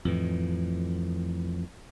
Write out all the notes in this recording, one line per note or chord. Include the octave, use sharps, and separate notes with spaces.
F2 A2 E3